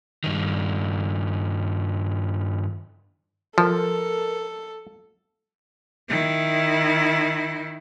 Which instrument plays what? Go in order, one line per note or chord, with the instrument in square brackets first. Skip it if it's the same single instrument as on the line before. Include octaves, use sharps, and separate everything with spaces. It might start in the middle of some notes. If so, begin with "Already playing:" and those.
[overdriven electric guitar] G2 D#3
[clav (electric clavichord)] F3 [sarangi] A4 [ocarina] A#4
[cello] D#3 E4